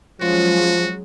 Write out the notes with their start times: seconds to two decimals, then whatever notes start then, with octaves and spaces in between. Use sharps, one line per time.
0.21 F3 F#3 G#3 C#4 F4 F#4